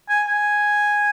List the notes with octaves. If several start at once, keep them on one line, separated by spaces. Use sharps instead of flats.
G#5
G#5